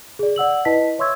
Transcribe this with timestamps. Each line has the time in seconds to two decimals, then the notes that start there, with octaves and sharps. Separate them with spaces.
0.19 G#4 D5
0.36 D5 F#5 E6 F#7
0.65 E4 B4 D#5 A5 B6
0.99 C#5 E5 C6 C#6 E6 G#6